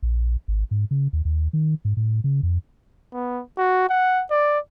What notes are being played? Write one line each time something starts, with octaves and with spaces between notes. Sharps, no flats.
A#1
G#1
G#2
C#3
D#2
D#2
D#3
G#2
A2
C#3
F2
B3
F#4
F#5
D5